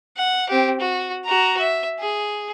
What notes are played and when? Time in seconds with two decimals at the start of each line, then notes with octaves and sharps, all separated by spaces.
0.17 F#5
0.49 C4 G4
0.80 F#4
1.25 F#4 A#5
1.60 E5
1.99 G#4